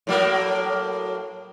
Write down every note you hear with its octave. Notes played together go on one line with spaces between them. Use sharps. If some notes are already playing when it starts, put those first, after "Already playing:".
A2 F#3 A#3